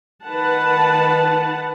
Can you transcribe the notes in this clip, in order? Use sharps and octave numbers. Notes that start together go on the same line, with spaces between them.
D#3 B4 F#5 A5